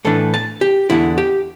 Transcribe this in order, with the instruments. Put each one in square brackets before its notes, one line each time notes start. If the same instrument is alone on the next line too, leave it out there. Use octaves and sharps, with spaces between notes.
[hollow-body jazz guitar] A2 E3 B3 D4 A4
A5
G4
E2 D3 B3 E4
G4